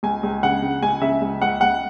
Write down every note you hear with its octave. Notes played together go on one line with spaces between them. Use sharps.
C#2 G#5
C#2
C#3 F#5
C#3
C#2 G#5
C#3 E5
C#2
C#2 F#5
C#2 F#5